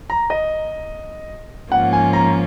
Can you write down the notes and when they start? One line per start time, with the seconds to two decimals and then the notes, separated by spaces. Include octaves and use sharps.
0.10 A#5
0.30 D#5
1.72 G#2 F3 A#3 C#4 F4 F#5
1.93 G#5
2.13 A#5